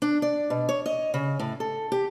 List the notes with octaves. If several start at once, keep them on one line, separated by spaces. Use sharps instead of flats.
D4
D5
B2
C#5
D#5
C#3
A2
A4
G4